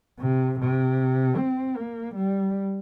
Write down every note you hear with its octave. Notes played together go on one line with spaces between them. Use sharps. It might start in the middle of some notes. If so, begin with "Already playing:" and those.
C3
C3
C4
A#3
G3